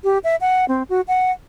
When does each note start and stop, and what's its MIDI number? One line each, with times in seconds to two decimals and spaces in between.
0.04 0.18 67
0.24 0.36 76
0.41 0.65 78
0.68 0.83 60
0.89 1.01 66
1.08 1.31 78